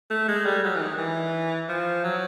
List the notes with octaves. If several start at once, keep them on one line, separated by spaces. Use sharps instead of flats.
A3
G#3
G3
F#3
E3
D#3
E3
F3
F#3